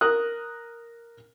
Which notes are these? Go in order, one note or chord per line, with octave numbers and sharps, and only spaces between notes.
A#4 D#6 F#6